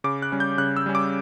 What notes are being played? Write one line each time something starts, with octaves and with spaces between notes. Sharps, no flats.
C#3 D6
F#6
G3 C#4
G6
C#3 F#6
E6
G3 C#4
D6